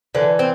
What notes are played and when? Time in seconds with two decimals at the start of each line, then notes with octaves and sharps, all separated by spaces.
0.15 D3 E3
0.39 C4